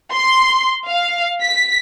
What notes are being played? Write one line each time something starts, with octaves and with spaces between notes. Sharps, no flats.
C6
F5
B6